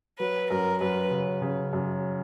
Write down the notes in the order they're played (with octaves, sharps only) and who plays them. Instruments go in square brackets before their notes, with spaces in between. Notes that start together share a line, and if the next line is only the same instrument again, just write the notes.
[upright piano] F#3 [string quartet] B4
[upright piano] F#2 [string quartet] A#4
[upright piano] F#2 [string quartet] B4
[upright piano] C#3
C#3
F#2